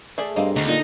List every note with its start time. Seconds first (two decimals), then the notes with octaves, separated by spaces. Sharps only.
0.18 A3 G#4 A4 D5 E5
0.36 G2 A#3 C4 D#5 F5
0.56 D2 D#5 A#5
0.68 A#2 D3 D#4